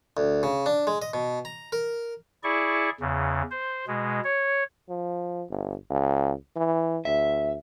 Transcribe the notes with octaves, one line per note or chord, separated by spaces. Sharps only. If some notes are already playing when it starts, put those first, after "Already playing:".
D2
C#3
D4
G#3
D#5
B2
A#5
A#4
E4 G#4 D5 C#6
E2 C#3
C5
B2 G#3
C#5
F3
G1
C#2
E3
D2 E5